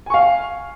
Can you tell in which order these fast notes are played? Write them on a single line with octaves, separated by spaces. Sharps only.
G#5 C#6 F5